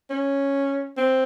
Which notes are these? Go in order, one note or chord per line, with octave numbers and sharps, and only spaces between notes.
C#4
C4